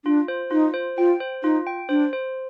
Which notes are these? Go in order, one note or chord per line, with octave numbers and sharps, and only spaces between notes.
D4 F4
C5
D#4 F4
C5
F4 G5
C5
D#4 F4
G5
D4 C5
C5